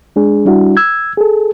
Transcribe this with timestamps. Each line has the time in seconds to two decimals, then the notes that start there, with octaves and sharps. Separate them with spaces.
0.16 G#3 D4 G#4
0.45 G3 D4 E4 F#4
0.77 E6 G#6
1.17 G#4 A4